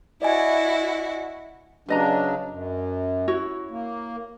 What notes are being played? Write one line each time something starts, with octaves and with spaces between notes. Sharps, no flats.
E4 F#4 D5 D#5 G#5
C#3 F#3 D4 B4 D#5 A#5
F#2
E4 F#4 C#5
A#3